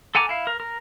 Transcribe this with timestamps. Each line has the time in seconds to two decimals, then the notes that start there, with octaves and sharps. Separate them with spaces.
0.15 A4 F#5 G#5 A#5 D6
0.29 E4 F5
0.47 A#4
0.60 A#4